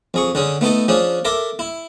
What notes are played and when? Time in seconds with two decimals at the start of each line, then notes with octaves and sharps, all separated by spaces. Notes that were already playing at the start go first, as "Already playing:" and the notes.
0.14 F2 G#4 C#6
0.35 D3 C#4 G#4
0.61 A3 B3 D#4 A4
0.88 F3 C#4 D4 G#4
1.25 A4 A#4 E5 D6
1.59 E4